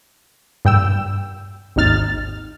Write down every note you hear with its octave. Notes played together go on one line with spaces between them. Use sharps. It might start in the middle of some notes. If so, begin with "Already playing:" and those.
G2 G5 E6
G#1 D#2 D#4 F6 A6